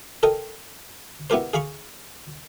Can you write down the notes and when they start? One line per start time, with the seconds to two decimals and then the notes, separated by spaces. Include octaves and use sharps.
0.23 A4 A#4 D#5 G5
1.30 B3 E4 G4 A#4 C5
1.53 G#4 F5 A#5 B5 C#6